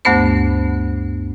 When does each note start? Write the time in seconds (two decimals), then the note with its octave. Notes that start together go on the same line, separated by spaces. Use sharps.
0.05 D2 G2 A3 B3 C5